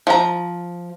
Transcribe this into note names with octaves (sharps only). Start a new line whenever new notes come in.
F3 A#5